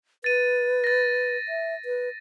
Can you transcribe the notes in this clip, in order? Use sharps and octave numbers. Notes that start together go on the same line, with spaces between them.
B4 A6 D#7
A6 A#6
E5
B4